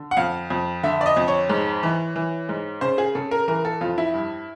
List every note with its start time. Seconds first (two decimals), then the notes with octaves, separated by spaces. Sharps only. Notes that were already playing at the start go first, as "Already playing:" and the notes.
Already playing: D3
0.11 F#5
0.17 F2 F5
0.50 F2
0.83 D3 E5
1.01 D5
1.06 D#5
1.17 F2
1.28 C#5
1.49 G#2
1.83 E3
2.16 E3
2.49 G#2
2.81 C#3 C5
2.98 G#4
3.15 C#3 A4
3.31 A#4
3.48 E3 A#4
3.65 A4
3.81 F2 F4
3.98 E4
4.14 G2